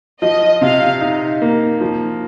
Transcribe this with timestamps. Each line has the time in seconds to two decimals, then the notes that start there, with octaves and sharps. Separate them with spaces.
0.22 F3 D#5
0.61 C3 F5
1.01 D#4
1.42 A#3
1.81 F3